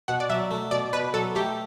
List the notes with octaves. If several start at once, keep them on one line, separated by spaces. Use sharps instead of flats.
B2 F#5
D5
F#3 E5
A3
B2 D5
B2 B4
F#3 A4
A3 G4